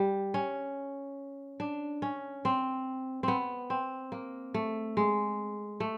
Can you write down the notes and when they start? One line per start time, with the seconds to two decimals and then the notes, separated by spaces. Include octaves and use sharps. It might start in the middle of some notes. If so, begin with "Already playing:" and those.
Already playing: G3
0.34 C#4
1.60 D4
2.02 C#4
2.45 C4
3.23 B3 C4
3.70 C4
4.12 A#3
4.54 A3
4.97 G#3
5.80 A3